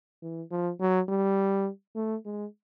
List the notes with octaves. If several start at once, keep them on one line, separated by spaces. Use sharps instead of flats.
E3
F3
F#3
G3
A3
G#3